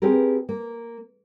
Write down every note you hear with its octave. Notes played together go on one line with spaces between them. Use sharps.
B3 C4 G4 G#4 A#4
A#3